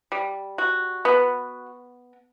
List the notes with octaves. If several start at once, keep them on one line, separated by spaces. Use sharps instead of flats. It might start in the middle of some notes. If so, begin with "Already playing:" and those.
G3
F#4
B3